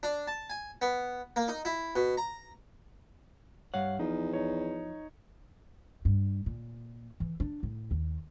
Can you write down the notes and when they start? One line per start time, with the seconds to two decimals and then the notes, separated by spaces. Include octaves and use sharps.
0.03 D4
0.27 A5
0.50 G#5
0.82 B3
1.36 A#3
1.48 D#4
1.65 E4
1.96 B2
2.17 A#5
3.74 G2 C#5 F5 F#5
3.99 E2 F3 D#4
4.33 D#4 C#5
6.05 G2
6.46 A#2
7.20 E3
7.40 D4
7.63 A2
7.91 D#2